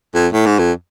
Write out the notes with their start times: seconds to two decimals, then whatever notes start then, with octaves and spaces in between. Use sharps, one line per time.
0.15 F2
0.33 A2
0.46 G#2
0.59 F2